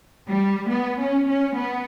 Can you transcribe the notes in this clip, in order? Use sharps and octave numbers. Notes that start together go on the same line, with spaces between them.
G3
B3
C#4
C#4
B3